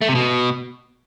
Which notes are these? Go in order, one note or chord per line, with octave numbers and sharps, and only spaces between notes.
A3
C3
B2